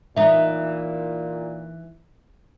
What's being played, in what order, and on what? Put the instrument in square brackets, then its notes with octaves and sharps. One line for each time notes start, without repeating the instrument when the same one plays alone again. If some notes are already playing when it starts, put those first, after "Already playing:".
[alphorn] A#2 [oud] E3 D#4 [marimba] E5